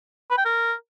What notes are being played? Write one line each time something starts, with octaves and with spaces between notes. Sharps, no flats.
B4
G5
A#4